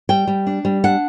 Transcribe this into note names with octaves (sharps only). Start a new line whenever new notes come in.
G3 G5
G3
D4
G3
D4 F#5